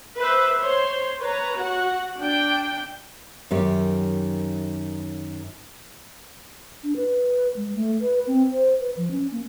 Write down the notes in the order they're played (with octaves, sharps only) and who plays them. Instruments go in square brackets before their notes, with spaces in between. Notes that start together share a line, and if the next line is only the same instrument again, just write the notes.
[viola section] B4 C5 E5
C5 C#5 C6
B4 C#5 A#5
F#4 F#5
D4 G5
[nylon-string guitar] F#2 D#3 G4
[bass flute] D4
B4
G#3
A3
B4
C4
C5
B4
F3
C#4
A#3